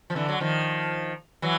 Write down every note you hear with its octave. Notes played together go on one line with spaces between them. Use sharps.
F3
D3 E3
F#3
D#3 F3
E3 F#3